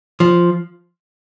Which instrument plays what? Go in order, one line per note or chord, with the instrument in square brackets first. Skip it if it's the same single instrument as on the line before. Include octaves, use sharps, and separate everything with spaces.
[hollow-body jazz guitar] F3